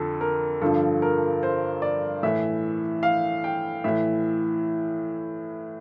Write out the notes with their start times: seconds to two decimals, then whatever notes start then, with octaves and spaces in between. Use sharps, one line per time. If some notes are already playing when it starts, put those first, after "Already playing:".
Already playing: F2 D3 A4
0.21 A#4
0.62 G2 D3 F3 A4
1.02 A#4
1.43 C5
1.82 D5
2.23 A2 E3 E5
3.03 F5
3.44 G5
3.84 A2 E3 E5